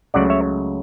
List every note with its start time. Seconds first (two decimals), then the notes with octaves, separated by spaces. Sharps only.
0.14 C#2 C#3 F#3 A3 D5 F#5
0.30 C#5 E5